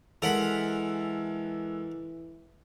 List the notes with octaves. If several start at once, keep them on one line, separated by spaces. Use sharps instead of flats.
E3 G#3 A4 A#4 F#5 B5